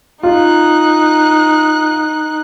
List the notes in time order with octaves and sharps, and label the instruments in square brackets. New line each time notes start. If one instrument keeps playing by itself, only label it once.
[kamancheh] D#4 F#6 [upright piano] F4